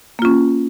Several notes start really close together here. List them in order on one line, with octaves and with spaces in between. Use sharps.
A#3 F4 C#4